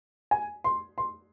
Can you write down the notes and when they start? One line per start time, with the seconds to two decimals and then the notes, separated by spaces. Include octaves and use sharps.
0.31 G#5
0.64 C6
0.98 C6